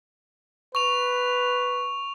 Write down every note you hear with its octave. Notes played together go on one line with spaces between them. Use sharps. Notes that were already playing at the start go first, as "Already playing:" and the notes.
B4 C#6 F7